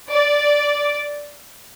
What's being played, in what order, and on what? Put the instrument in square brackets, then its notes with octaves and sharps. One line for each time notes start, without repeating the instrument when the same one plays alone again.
[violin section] D5